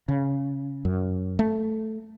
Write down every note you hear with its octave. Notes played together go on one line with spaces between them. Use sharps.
C#3
F#2
A3